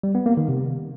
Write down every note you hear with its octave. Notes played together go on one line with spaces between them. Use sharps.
G3
B3
A#3
D#3
C3